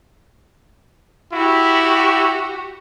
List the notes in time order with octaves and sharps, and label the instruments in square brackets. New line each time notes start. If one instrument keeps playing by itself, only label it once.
[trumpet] E4 [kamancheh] F#4 G4